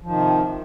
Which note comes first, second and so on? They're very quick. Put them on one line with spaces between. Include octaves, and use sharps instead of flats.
F3 D#3 C3